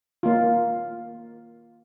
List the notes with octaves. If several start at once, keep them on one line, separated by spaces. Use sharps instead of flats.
A#3 F4